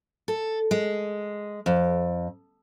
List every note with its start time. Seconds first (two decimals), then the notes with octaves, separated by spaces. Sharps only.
0.28 A4
0.71 G#3
1.66 F2